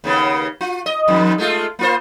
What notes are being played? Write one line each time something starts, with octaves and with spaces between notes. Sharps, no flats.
D#2 C#3 B3
F4
D#5
F2 G#2 D#3
G#3 A3 F4
A#3 F4 C5